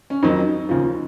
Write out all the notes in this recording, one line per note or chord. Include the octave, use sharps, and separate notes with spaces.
C#4
F2 D#3 F#3 D#4
D#2 C#3 F3